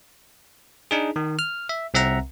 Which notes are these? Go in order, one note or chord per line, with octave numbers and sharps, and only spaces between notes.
D4 D#4 G#4
D#3
F6
E5
C2 C4 E5 F#5 A#5